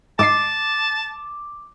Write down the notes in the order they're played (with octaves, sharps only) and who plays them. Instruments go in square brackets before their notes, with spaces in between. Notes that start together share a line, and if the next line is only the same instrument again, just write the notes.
[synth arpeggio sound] G#2 D#5 C7 [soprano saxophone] A5 [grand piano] D6